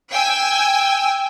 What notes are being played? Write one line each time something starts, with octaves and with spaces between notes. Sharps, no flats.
G5 G#5 E6